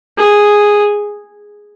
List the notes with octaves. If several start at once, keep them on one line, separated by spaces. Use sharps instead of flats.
G#4